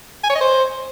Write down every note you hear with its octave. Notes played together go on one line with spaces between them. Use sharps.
G#5
C#5
D#5
C5